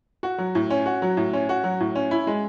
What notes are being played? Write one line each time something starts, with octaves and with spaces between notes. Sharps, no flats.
F#4
F#3
A2
C#4
F#4
F#3
A2
C#4
F#4
F#3
A2
C#4
E4
G#3